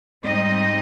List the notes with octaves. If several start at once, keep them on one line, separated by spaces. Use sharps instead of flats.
G#2 G3 C4 D#4 D#5